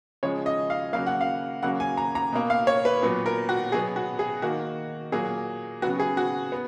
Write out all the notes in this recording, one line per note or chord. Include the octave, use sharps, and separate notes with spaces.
C#3 F3 G#3 C#5
D#5
F5
C#3 F#3 A#3 F5
F#5
F5
C#3 F#3 A#3 F#5
G#5
A#5
A#5
B2 A#3
F5
C#5
B4
A#2 F#3 B3
A#4
F#4
B2 F#3 B3 G#4
F#4
G#4
D#3 A#3 F#4
A#2 F#3 A#3 G#4
C#3 F#3 B3 F#4
G#4
F#4
B3